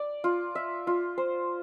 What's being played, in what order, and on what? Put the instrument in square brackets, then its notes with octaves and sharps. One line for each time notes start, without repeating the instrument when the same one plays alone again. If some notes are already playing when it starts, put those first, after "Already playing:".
Already playing: [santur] D5
F4
E5
F4
C5